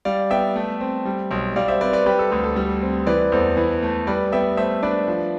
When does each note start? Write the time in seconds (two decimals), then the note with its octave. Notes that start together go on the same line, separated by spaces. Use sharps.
0.05 G3 D5 F5
0.30 B3 E5 G5
0.56 A3
0.81 C4
1.05 G3
1.31 B1
1.56 G3 D5 F5
1.68 C5 E5
1.81 C4 B4 D5
1.93 B4 D5
2.06 G3 G4 B4
2.19 A4
2.31 D2 G4
2.44 A4
2.56 G3
2.82 C4
3.07 E3 B4 D5
3.32 E2 A4 C5
3.57 E3
3.83 A3
4.07 G3 B4 D5
4.32 B3 E5 G5
4.57 A3 C5 E5
4.83 D4 B4 D5
5.08 F3